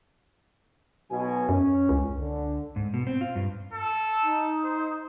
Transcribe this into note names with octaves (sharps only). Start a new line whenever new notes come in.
B1 B2 G#5
F#2 C#4
C#2
D3
G#2
B2
C4
F4
G2
A4
D#4
C5